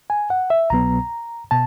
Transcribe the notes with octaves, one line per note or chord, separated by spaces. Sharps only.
G#5
F#5
E5
C2 B2 F#3 B3 A#5
B2 A5